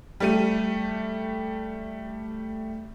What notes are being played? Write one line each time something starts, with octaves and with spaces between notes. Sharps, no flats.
G3 A3 D#7